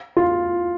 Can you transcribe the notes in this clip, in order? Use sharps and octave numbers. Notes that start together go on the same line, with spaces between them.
F4